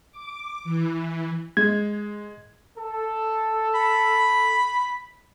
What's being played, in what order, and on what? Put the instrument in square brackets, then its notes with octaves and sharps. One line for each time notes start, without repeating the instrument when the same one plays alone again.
[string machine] D6
E3
[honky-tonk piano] G#3 [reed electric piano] G#6
[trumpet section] A4
[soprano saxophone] B5